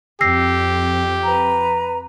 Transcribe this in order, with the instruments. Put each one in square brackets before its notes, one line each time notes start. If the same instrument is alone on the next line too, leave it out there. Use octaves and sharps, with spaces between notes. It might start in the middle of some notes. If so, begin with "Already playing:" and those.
[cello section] F2 [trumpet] G4 [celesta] E6 A#6 C7
[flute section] B4 A#5